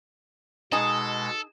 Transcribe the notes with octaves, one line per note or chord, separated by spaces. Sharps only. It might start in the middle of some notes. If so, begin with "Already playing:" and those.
B2 G#3 D#4 G#4 A4